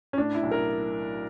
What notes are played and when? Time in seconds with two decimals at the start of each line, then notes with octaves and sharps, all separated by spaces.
0.13 C#4
0.18 A2 D4
0.35 E4
0.43 B1
0.51 A#4